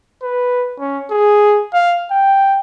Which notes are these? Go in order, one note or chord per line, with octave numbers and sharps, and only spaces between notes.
B4
C#4
G#4
F5
G5